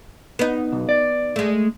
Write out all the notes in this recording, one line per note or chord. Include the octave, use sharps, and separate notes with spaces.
B3 D#4
B1
D5
G#3 A3